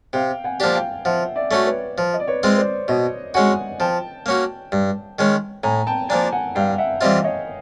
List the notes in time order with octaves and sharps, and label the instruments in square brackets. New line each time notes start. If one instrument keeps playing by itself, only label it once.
[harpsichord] C3 [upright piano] F5 G5
[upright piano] F#5 G#5
[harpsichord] F3 A#3 D4 G4
[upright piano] F5 G5
[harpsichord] F3 [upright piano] E5 F#5
[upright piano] D5 E5
[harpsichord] A3 C#4 F#4
[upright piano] B4 C#5
[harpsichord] F3
[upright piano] D#5
D5
B4 C#5
[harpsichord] G#3 C4 F4
[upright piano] C5 D5
[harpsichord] B2 [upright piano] C#5 D#5
[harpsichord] G#3 C#4 F#4 [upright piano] F#5 G#5
[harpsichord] F3 [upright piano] G5 A5
[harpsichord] A#3 C#4 F#4
G2
D#3 G#3 C#4
[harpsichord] A2 [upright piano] G#5 A#5
[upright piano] G5 A5
[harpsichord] F3 A#3 D4 [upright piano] G#5 A#5
[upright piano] F#5 G#5
[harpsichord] G2 [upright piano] F5 G5
[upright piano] E5 F#5
[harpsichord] E3 G3 C4 F4 [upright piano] D#5 F5
[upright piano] C#5 D#5